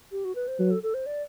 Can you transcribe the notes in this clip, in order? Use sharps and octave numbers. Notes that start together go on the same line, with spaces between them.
G4
F#4
B4
C5
F#3 B4
A4
A4
C5
D5